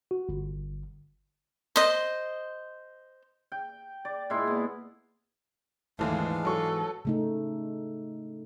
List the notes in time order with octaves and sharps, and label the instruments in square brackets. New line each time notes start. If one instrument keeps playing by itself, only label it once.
[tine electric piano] F#4
G1
[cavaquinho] C5 D#5
[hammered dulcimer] G5
D5
A#2 G#3 E4 C6
B3
[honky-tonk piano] D#2 A3 [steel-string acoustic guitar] G#2 E3 B3 [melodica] G#3 D4 F5
[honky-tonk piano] F#3 C#6 [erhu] A4
[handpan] C#3 A3 D#4